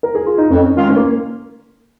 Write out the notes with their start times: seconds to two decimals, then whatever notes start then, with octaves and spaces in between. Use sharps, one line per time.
0.03 A#4
0.15 G#4
0.26 F4
0.38 D#4
0.50 F2 C#4
0.76 D#3 G#3 F4
0.89 C#4
0.96 A#3